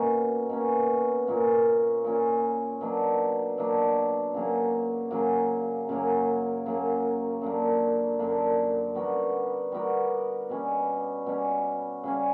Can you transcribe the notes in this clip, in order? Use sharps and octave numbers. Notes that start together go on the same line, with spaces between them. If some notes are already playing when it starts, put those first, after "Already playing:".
Already playing: B2 A#3 C#4
B2 A#3 C#4
A#2 A#3 C#4
A#2 A#3 C#4
B2 F#3 A#3 D4
B2 F#3 A#3 D4
C#3 F#3 A#3
C#3 F#3 A#3
F#2 C#3 F#3 A#3
F#2 C#3 F#3 A#3
F#2 D3 A#3
F#2 D3 A#3
G3 B3 F#4 A#4
G3 B3 F#4 A#4
B2 G3 C#4
B2 G3 C#4
C#3 G3 C#4